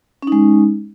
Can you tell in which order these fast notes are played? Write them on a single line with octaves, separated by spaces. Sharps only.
C#4 D#4 G#3